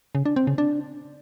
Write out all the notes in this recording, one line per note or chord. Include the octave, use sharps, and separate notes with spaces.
C#3
D4
C4
C#3
D4